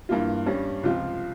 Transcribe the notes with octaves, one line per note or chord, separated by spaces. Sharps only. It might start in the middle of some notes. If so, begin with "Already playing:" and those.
G2 E3 A#3 F4
G2 G3 C#4
C#2 C3 F3 C4 F4